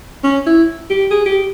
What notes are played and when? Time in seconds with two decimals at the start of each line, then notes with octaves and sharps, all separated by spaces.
0.24 C#4
0.46 E4
0.90 G4
1.11 G#4
1.26 G4